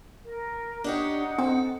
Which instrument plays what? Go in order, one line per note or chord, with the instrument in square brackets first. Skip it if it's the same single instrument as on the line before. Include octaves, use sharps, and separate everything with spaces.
[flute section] A#4
[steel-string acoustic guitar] D4 G4 C#5 [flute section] D#4 F#5
[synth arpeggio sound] C4 [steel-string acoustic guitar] A4